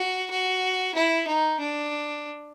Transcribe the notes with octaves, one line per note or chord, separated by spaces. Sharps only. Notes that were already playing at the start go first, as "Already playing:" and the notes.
Already playing: F#4
F#4
E4
D#4
D4